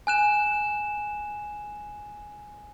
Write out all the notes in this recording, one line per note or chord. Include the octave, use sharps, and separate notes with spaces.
G#5 F#6 E7